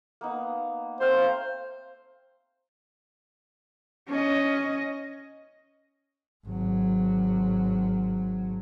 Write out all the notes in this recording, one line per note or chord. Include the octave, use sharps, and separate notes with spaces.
A#3 B3 D#4
A3 C4 C5 F5
C#4 D#5
G#1 F#3